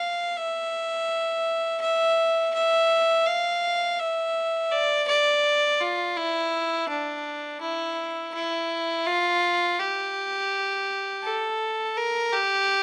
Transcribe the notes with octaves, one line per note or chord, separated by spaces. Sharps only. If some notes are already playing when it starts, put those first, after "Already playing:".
Already playing: F5
E5
E5
E5
F5
E5
D5
D5
F4
E4
D4
E4
E4
F4
G4
A4
A#4
G4